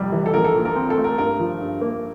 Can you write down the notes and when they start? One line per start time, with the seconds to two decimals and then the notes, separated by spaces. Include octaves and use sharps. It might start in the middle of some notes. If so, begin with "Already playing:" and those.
Already playing: F1 F2 G3
0.12 E3
0.26 A4
0.34 A#1 A#4
0.44 A4
0.55 A#2
0.65 A#4
0.76 C4
0.90 A4
0.97 A3
1.04 A#4
1.18 G2 A#4
1.40 F3
1.61 G2
1.81 A#3